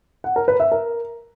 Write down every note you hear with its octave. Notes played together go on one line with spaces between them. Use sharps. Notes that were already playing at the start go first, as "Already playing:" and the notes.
F#5
A#4
B4
E5
A#4